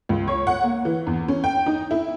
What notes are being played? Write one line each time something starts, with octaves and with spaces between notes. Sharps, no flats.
C#2
C#5
F#5
A#3
E3
E2
C#4
G5
D#4
E4